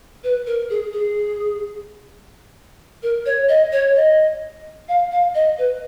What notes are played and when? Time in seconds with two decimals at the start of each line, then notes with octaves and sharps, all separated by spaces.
0.24 B4
0.47 A#4
0.70 G#4
0.93 G#4
3.03 A#4
3.26 C#5
3.49 D#5
3.73 C#5
3.96 D#5
4.89 F5
5.12 F5
5.35 D#5
5.58 B4